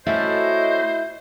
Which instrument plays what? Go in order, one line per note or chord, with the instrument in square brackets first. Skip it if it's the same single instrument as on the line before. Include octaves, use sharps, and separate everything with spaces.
[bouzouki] A3 C#4 F#4 [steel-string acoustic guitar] E4 B4 [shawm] C5 [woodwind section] D#5